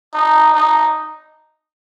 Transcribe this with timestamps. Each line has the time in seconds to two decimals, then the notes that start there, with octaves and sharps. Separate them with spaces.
0.14 D#4
0.54 D#4